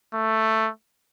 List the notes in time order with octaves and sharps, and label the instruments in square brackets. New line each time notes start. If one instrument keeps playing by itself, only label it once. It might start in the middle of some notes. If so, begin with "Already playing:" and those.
[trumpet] A3